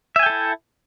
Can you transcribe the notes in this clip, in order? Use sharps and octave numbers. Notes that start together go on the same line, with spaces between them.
E4 A4 E5 G5 G#5